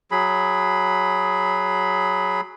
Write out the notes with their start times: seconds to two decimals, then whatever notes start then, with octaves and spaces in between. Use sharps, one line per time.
0.11 F#3 G#4 B5